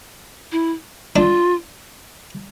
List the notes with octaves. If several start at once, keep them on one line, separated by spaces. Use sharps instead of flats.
E4
D4 F4